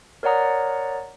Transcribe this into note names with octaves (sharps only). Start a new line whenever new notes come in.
A#4 C#5 D5 F#5 A#5 D#6